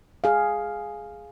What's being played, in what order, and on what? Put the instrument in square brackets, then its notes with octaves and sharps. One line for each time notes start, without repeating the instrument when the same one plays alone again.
[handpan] G#4 F5